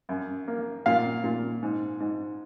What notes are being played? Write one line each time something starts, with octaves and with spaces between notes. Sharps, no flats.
F#2
A#3
A#2 F5
A#2
G#2
G#2